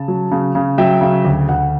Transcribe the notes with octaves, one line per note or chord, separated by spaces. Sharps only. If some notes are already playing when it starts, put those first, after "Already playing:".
Already playing: C#3 A5
F#3
C#3
C#3
F#3 E5 G5
C#3
D2
D2 F#5